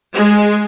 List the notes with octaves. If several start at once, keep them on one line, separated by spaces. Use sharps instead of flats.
G#3